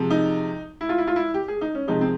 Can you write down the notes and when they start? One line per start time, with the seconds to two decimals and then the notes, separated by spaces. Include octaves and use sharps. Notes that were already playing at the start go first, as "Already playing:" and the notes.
Already playing: C3 F3 G#3
0.10 D#4
0.81 E4
0.89 F4
0.98 E4
1.07 F4
1.16 E4
1.34 G4
1.48 G#4
1.61 D#4
1.75 C#4
1.87 C3 F3 G#3 D#4
2.01 C4